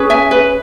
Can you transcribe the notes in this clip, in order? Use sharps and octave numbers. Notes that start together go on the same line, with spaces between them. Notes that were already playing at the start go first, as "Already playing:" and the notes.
Already playing: C#4 G#4 B4
E5 G#5
B4